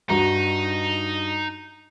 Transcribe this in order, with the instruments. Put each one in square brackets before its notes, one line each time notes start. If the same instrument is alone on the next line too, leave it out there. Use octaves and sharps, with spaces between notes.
[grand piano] G2 F#4 A#5 [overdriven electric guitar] D#4